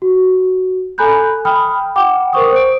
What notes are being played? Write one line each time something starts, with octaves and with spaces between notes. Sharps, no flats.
F#4
A4 G#5 A#5 B5 F#6 G6
G5 B5 D#6 F6
F#5 G5 D6
A#4 C5 C#6 D#6
C5 D7